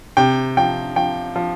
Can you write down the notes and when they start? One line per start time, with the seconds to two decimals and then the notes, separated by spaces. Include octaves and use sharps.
0.17 C3 G5
0.57 F3 G5
0.96 F3 G5
1.36 F3